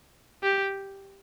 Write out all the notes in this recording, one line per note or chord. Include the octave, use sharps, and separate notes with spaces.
G4